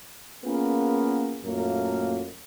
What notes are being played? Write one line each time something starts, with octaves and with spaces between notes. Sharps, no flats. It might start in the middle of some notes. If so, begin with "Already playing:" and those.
A#3 B3 C#4 F4 G#4 A#4
F#2 A#2 A3 A#3 A#4